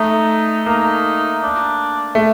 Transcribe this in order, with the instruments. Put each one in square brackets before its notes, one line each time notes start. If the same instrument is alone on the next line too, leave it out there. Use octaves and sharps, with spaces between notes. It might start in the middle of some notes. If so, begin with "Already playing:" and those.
Already playing: [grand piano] A3 [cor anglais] D#4
[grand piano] A#3 [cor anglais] D#4
[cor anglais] D4
[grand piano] A3